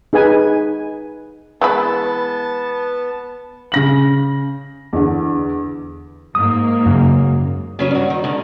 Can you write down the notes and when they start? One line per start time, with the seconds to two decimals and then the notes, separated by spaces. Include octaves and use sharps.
0.13 D#4 G#4 B4 G#5
1.61 E3 G#3 B3 B4 A5
3.72 C#3 A#6 F#7
4.93 E2 D3
6.35 G#2 A#3 D#6
6.86 F#2 C#3
7.79 C#3 F#3 C#4
7.91 G2 F#4
8.10 D#3
8.24 G#2 D3 D#3